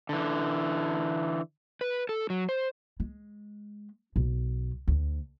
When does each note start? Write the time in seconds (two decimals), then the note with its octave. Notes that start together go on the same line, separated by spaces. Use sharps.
0.09 D3 E3
1.81 B4
2.09 A4
2.30 F#3
2.49 C5
3.00 G#3
4.16 B1
4.88 D2